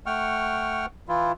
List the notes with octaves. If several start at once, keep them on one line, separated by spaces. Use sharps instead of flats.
A3 F#5 G5 C#6 F6
E3 E4 F4